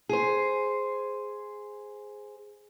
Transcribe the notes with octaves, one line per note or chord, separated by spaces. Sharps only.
G#4 C5